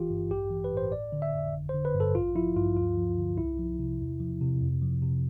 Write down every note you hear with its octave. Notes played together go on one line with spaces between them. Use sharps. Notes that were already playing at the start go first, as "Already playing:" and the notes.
Already playing: G1 E3 F4 G4
G2
A1 G4
E3
B4
A2
C5
G1 D5
D3
E5
F2
G1
C5
D3
B4
G2
A4
A1 F4
F3 E4
G2 F4
D2 F4
F3
D3
C2 E4
F3
C3
E2
F3
C3
F2
F3
C3